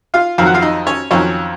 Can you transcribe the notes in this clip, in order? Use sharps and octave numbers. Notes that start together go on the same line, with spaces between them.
F4 F5
F2 D#3 F#3 F5
F#5
F4 F5
D#4 D#5
C#4 C#5
F2 D#3 F#3 C#4 C#5